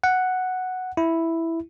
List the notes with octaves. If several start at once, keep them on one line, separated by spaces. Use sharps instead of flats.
F#5
E4